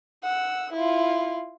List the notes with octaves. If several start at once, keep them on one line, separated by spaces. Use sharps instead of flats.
F#5 E6
E4 F4